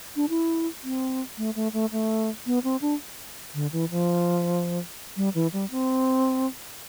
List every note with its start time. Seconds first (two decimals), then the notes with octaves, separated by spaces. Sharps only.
0.16 D4
0.29 E4
0.83 C4
1.38 A3
1.56 A3
1.73 A3
1.92 A3
2.46 B3
2.64 C4
2.82 D4
3.54 D3
3.72 E3
3.91 F3
5.17 G3
5.35 E3
5.53 G3
5.71 C4